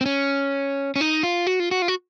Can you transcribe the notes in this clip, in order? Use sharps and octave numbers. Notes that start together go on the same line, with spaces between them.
C4
C#4
C#4
D#4
F4
F#4
F4
F#4
F4
F#4